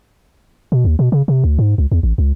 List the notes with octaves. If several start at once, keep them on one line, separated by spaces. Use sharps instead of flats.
B2
D#2
B2
C#3
C3
D2
G#2
C#2
E2
A1
C#2